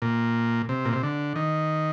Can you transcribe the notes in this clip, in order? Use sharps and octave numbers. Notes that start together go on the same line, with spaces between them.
A#2
C3
A#2
C3
D3
D#3